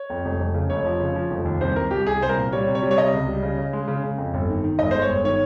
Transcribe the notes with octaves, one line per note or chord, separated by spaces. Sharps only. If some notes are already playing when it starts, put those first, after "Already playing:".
Already playing: C#5
F2
F1
F1
C#3
F1 C#5
F3
C#3
F3
F1
D#2
C2 C5
C2 A#4
C2 G4
C2 G#4
C2 C5
A#4
A#2
G3 C#5
C3
C#5
G3
C#5
C3 D#5
C#2
G3
C#3
C#3
G#3
C#3
C#3
F2
G1
D#3
D#3
G1 D#5
G#3 C5
C#5
G1
D#3 C#5